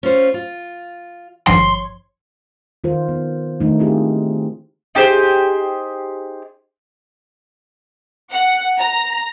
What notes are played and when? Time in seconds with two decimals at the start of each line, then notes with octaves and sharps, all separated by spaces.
0.03 C#4 F4 C5
0.34 F4
1.47 G#1 G2 F3 C#5 C6
2.84 D#3 F4 A#4 C5
3.09 B3
3.60 D#3 A3 D4 D#4
3.79 C4 E4 F4 G4 G#4
4.95 D#4 G4 G#4 C5
8.31 F#5
8.80 A#5